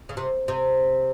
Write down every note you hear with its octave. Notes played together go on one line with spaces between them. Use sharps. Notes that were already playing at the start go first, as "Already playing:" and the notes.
C#3
C3
C3